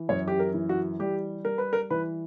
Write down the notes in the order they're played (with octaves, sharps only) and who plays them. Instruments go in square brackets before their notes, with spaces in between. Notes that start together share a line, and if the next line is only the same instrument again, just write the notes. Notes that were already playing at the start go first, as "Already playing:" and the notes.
Already playing: [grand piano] E3
F#2 C#5
G4
A#4
E3
F#4
G3 G4
G3 A#4
B4
A#4
E3 B4